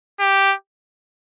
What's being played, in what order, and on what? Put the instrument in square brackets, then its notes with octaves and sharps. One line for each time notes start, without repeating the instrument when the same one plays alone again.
[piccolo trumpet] G4